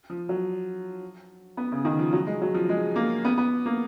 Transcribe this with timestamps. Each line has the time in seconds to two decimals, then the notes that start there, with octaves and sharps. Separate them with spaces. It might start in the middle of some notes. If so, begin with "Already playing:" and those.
0.10 F3
0.29 F#3
1.57 B3
1.72 C#3
1.85 D#3
1.99 F3
2.13 F#3
2.27 G#3
2.41 F#3
2.54 F3
2.69 G#3
2.96 A#3
3.25 B3
3.38 B3
3.66 A#3